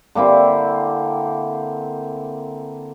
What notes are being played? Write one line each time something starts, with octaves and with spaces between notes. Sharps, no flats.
D3 A#3 C4 E4